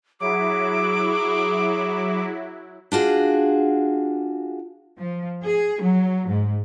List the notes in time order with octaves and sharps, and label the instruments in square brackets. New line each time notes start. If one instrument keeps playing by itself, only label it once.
[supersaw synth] F#3 E4 [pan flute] G#4 [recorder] D6
[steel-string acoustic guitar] D4 F4 F#4 G#4
[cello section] F3
G#4
F#3
G#2